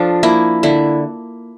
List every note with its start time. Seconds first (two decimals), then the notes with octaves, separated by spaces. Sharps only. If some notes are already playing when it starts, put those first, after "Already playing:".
Already playing: F3 D4 F4 A4
0.23 A#3 E4
0.63 D3 E4